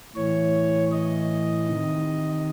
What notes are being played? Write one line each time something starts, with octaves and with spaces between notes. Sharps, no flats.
A2 E3 C#5
D#5
C3 D#3